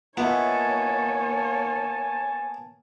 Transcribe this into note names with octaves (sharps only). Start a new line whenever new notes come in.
A#3 B3 F4 C#5 D#5 E5 G#5 A5